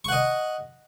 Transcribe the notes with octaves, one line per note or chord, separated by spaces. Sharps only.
D#5 F#5 C#6